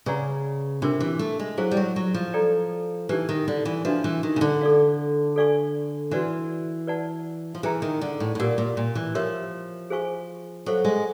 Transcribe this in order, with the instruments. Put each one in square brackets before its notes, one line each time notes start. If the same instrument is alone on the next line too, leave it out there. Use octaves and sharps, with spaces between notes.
[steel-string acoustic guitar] C#3 [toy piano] G#4 B4 D5 F#5 A#5
[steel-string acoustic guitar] C3 [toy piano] D4 F4 A#4
[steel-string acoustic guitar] E3
A3
G#3
[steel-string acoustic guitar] F#3 [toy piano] E4 G#4 C5 F5
[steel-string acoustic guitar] G3
F#3
F#3
F3
[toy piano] A4 D5 G5 A#5
[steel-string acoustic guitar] E3 [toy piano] D#4 G4 B4
[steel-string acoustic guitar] D#3
D3
E3
[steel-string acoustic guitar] F3 [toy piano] D4 F#4 B4 E5
[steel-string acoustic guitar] E3
D#3
C#3
D3
[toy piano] A4 D5 F5
A4 D5 F5 G#5 C#6
[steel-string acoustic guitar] E3 [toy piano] F#4 B4 D5 F#5
[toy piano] B4 D5 F#5 A5
[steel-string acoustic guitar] F3
[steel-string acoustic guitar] E3 [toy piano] G#4 B4 E5 G5 A#5
[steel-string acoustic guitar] D#3
D3
A2
A2
[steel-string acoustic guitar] A#2 [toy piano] G4 A#4 D5 F#5
[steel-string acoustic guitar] A#2
A#2
E3
[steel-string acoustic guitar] F3 [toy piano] G4 A#4 C#5 E5
[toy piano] G#4 C5 F5 G#5 C#6
[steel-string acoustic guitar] F#3 [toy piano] A4 C5 F5
[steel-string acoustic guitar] G#3